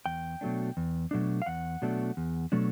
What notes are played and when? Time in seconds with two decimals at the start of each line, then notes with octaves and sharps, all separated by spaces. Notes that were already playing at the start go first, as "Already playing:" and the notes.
0.06 E2 G5
0.41 B2 F#3 A3 D4
0.77 E2
1.11 B2 F#3 A3 D4
1.42 F5
1.46 E2 F#5
1.82 B2 F#3 A3 D4
2.17 E2
2.52 B2 F#3 A3 D4